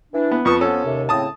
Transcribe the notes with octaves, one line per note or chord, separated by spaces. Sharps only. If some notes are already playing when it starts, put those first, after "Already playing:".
E3 D4
B3
F2 B4 A5 C#6 D#6
F3 B3 C#4 A4
D#2 C3
A2 C#3 C4 A5 D#6